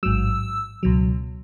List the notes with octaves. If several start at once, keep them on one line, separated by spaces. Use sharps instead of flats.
A1 G#2 F#3 E6
C#2 B2 F#3